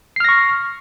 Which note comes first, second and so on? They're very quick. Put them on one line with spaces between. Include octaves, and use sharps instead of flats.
C7 F6 A#6 C#6